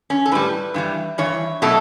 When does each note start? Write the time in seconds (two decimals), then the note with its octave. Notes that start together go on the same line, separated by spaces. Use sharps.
0.10 C#4
0.26 A4
0.32 A2 G3 B4
0.74 G2 E3 G3
1.18 G2 E3 C#5
1.62 B2 F#3 A3 A4